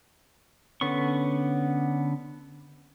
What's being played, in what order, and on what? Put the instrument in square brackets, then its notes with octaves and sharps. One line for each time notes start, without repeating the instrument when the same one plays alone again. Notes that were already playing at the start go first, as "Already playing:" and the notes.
[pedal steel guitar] D3 B3 C#4 C#6